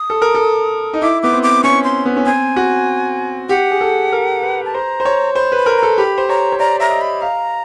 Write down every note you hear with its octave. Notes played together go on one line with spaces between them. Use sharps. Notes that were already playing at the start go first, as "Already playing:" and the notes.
Already playing: D#6
A4
A#4
A4
D#4
E4 D6
B3 D6
C4
D6
C#4 C#6
C6
B3
C#4
C4 G#5
F#4
G4 F#5
G#4
A4
A#4
B4
A5
C5 A#5
C5
C#5
C5 B5
B4
B5
A#4
A#5
A4
G4 B5
C5
C#5 A#5
C#5
D5 A#5
E5 A#5
D#5
B5
F5 A#5